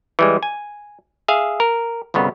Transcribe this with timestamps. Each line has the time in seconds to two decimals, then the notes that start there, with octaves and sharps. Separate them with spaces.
0.19 E3 G3 G#3
0.43 G#5
1.28 G#4 E5 F5
1.60 A#4
2.14 G1 C2 C#3 B3